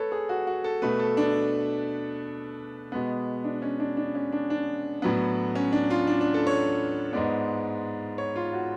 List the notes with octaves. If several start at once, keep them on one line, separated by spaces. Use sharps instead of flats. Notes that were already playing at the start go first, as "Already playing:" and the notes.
Already playing: A3 A4 B4 C#5
G#4
F#4
F#4
A4
B2 A3 B4
A4
D4
B2 G#3 B3
D4
C#4
D4
D4
C#4
D4
D4
A2 F#3 B3
C#4
D4
F4
D4
D4
A4
C#5
G#2 G#3 B3 D5
C#5
F4
F#4